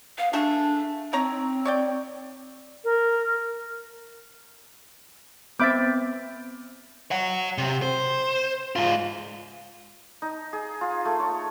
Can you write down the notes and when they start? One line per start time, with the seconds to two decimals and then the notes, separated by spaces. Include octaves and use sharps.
0.18 B3 F5
0.33 A3 D4 G#4 A4
1.13 C4 D#4 C#5 A#5
1.65 C#5 D5 G5
2.84 A#4
5.60 B3 C4 E5 B5 D6 G6 A6
7.11 C#5 F#5
7.58 C3
7.82 C5
8.76 G#2 F4
10.22 D#4
10.53 G#4
10.81 F4
11.05 A3
11.20 C#5